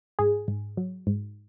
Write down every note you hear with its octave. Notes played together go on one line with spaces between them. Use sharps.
G#2 G#4
G#2
F#3
G#2